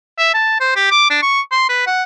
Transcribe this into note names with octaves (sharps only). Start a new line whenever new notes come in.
E5
A5
C5
G4
D6
D4
C#6
C6
B4
F#5